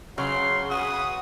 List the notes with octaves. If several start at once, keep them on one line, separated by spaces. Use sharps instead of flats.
C#3 F#3 C6
C#4 F#4 B4 D#6